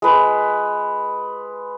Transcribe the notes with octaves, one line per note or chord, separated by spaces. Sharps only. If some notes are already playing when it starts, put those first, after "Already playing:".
G#3 B4